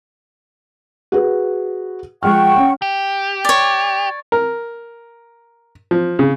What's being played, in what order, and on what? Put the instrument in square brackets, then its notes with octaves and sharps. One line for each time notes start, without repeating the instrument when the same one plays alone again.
[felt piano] F#4 G#4 B4
[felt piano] F3 G#3 F6 [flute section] F#5 G5 C#6
[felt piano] C#4
[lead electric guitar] G4
[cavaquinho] C#5 D5
[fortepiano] A#4
F3
C#3